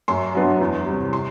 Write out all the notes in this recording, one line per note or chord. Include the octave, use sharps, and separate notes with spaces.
F#2 C6
F#3 B3 D4
E2
C3 G3
C6